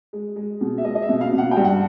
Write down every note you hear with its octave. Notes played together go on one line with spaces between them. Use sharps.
G#3
G#3
B2
E5
G#3 D#5
D#5
E5
B2
F5
B2
F#5
G5
G2
F#5